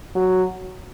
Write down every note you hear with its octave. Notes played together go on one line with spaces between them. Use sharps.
F#3